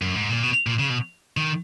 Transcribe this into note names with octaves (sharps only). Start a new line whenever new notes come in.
F#2
G#2
A#2
B2
A#2
C#3
B2
D#3